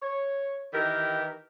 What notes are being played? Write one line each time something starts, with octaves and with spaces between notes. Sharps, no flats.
C#5
D#3 E3 G4 A#4